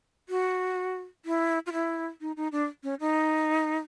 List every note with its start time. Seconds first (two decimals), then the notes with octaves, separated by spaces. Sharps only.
0.29 F#4
1.25 E4
1.66 F4
1.73 E4
2.21 D#4
2.37 D#4
2.52 D4
2.83 C#4
3.00 D#4